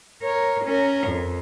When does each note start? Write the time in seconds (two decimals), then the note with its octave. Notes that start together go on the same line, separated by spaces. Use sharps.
0.23 A#4 C#5
0.65 C#4 A#4
1.07 F2